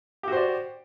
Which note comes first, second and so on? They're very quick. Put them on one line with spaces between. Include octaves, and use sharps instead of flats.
G4 F#4 C5 D5